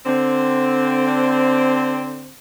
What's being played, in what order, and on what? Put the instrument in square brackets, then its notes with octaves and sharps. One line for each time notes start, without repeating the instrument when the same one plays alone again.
[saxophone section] D3 C4